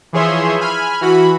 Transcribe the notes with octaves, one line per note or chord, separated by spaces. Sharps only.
E3 F3 G#4 C#5 E5 C6
G#5 B5 F6
E3 F#4 B5